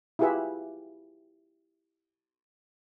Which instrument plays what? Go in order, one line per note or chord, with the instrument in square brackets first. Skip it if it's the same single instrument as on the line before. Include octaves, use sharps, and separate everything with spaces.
[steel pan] E4 F4 G4 G#4 B4 E5